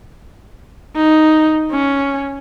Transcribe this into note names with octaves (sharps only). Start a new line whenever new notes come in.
D#4
C#4